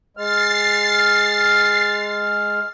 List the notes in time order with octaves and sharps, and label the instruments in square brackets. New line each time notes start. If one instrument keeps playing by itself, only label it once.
[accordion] G#3 F6 [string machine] A6 C7